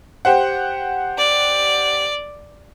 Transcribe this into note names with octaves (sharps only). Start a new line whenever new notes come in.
G4 C5 F#5
D5